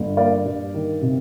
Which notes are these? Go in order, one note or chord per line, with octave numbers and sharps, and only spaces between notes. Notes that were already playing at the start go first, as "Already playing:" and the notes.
Already playing: G1
A#3 D5 F5
G2
D#3
C3